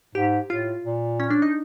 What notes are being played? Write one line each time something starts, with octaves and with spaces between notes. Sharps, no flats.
G#2 G4
A2 F4
A#2
C#4
D4
D#4